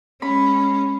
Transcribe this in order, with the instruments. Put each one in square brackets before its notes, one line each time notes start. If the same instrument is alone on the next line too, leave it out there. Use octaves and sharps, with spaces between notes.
[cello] G#3 C#4 [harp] B5